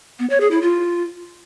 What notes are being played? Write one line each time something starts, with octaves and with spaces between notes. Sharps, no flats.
B3
C#5
G#4
E4
F4